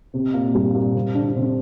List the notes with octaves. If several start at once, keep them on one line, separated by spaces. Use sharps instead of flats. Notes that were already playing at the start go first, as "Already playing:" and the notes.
C3 C4
A#2 A#3
G2 G3
A#2 A#3
C3 C4
D3 D4
D4
C3 C4